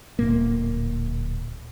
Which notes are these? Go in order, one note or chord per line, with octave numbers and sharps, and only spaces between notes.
D1 A#2 A#3